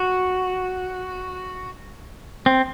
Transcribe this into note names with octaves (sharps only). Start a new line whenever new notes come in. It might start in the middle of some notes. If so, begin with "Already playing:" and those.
Already playing: F#4
C4